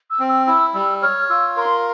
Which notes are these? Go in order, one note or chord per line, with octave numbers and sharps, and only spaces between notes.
E6
C4
E6
E4 E6
G3 E6
C#5 F6
F4 E6
A#4 C6